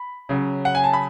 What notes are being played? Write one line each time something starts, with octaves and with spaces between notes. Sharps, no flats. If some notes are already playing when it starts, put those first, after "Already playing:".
Already playing: B5
C#3 F#3
F#5
G#5
A5
B5